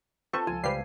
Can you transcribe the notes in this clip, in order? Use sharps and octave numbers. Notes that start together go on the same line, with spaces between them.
C4 F4 A4 B4 C5 C#6
C#2 F3 F4 G#5
C#2 G3 G4 B4 C5 F5 C7